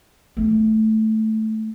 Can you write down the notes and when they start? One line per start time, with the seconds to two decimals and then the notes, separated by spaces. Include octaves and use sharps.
0.37 A3 A#3